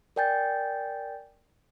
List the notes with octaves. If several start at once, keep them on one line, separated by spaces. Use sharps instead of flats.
A#4 D5 G5 G#5 G6 A6